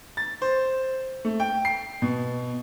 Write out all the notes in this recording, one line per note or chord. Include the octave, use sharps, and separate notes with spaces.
A6
C5
A3
G5
C7
B2